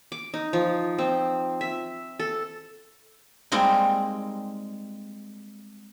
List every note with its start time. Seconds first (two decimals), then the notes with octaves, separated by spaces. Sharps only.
0.12 D6
0.34 D#4
0.53 F3
0.98 C4
1.61 E5
2.20 A4
3.52 G3 G#3 A#3 C4 D#4